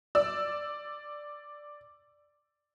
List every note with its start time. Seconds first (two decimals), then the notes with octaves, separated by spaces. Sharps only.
0.15 D5 E6